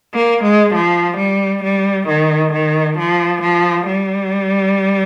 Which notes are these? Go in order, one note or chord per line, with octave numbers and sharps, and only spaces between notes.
A#3
G#3
F3
G3
G3
D#3
D#3
F3
F3
G3